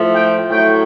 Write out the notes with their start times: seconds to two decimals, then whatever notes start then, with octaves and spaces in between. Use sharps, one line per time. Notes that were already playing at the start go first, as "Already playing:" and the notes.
Already playing: A2 F3 A3
0.13 G5
0.49 A2 F#3 A3 G5